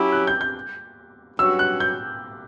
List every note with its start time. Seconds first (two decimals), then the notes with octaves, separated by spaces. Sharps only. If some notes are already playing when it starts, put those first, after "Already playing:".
Already playing: F#3 C#4 E4 G4
0.12 F#6
0.27 G6
0.41 G6
1.38 G2 F#3 C#4 F#4 E6
1.59 F#6
1.80 G6